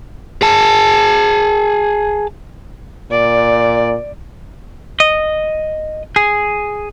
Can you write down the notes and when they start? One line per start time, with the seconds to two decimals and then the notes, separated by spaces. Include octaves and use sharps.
0.42 G#4 A5
3.11 A#2 D5
5.00 D#5
6.16 G#4